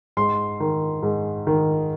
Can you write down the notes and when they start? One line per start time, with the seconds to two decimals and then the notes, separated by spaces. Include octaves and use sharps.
0.17 G#2 C6
0.60 D#3
1.03 G#2
1.47 D#3